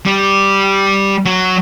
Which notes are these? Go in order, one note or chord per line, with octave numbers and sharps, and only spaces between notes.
G3
F#3